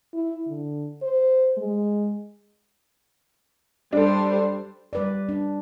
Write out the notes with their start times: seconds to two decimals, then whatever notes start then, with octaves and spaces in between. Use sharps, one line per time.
0.14 E4
0.47 D3
1.02 C5
1.57 G#3
3.93 G3 D4 A4 C5
4.93 G3 B4 D5
5.29 D4